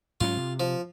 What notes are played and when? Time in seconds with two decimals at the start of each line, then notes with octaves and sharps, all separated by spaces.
0.21 G#2 F#3 C#4 F4
0.37 C3
0.60 F3